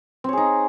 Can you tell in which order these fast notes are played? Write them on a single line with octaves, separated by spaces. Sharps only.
C4 C#5 G#4 D#4